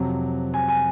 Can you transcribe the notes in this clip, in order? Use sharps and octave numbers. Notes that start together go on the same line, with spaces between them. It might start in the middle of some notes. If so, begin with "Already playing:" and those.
Already playing: F2 C3 F#3
G#5
G#5